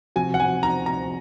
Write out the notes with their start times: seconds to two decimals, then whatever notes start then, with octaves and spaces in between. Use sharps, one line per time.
0.16 C3 F3 C4 F#4 G#5
0.34 F#5
0.40 G#5
0.63 A#5
0.86 A#5